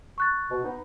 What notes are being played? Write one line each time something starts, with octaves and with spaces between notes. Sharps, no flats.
C#6 F#6 A6
B2
B3 D#4